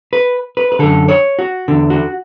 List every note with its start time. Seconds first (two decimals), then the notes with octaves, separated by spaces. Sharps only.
0.13 B4
0.57 B4
0.72 B4
0.79 F#2 D3 A4
1.08 C#5
1.39 F#4
1.68 E2 D3
1.90 F#4